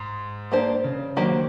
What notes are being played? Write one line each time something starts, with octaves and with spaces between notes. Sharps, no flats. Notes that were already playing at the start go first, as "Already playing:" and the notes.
Already playing: G#2
A#3 D4 G4 C5
C#3
D#3 F#3 A#3 D4 G4 C5